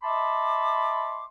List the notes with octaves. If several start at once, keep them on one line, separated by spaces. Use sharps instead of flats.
D#5 E5 A5 B5 C6 D6